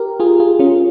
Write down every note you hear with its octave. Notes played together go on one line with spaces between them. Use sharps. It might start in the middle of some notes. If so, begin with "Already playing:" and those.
Already playing: G4 A#4
F4 G#4
F4 G#4
C#4 F4